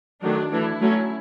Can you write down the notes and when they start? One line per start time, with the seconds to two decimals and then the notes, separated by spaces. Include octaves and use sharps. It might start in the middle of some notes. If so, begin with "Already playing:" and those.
0.23 D#3 F#3 A3 D4
0.51 E3 A3 D4 E4
0.81 F#3 A3 C#4